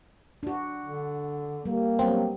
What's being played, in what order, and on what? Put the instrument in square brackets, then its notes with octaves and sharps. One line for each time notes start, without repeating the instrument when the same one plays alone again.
[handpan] D4 F#4
[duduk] D3
[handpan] G3 [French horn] A#3
[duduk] F#3 [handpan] G3 B3 [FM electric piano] C4